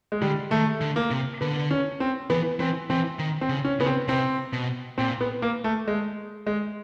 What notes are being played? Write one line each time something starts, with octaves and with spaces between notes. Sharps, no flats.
G#3
D3 G3
D#3 A3
D3
A#3
C3
D3 B3
C#4
C4
E3 B3
E3 C4
E3 C4
D#3
C4
C#3
C#4
C#3 B3
C4
C3 C4
B2
A#2 C4
B3
A#3
A3
G#3
G#3